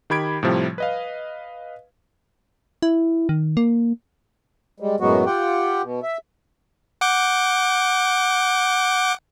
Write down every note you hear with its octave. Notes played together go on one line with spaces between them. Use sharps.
D#3 G4 B5 G#6 D7
A2 C3 F3 G3
B4 D#5 F5
E4
D#3
A#3
G3 G#3
F#2 A2 F#3 G#3 B3 F#4
F4 G4 F#5 G5
B2
E5
F#5 D6 G6